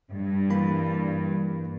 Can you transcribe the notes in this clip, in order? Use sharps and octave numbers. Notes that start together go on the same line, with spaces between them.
G2
E3 A#3 B5